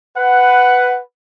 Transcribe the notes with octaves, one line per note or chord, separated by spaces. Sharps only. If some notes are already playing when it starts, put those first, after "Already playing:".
B4 F#5